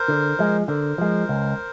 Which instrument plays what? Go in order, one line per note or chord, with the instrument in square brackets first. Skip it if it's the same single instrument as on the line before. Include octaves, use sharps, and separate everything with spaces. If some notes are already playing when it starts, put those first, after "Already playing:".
Already playing: [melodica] A#4 C5
[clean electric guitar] D3
F3 G#3
[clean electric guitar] D3 [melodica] A#4 C5
[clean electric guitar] F3 G#3
C#2